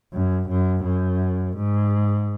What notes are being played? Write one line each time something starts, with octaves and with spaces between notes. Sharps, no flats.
F#2
F#2
F#2
G#2